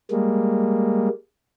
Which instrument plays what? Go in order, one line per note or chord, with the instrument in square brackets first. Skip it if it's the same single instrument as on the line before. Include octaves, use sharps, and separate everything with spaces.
[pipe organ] G3 G#3 A#3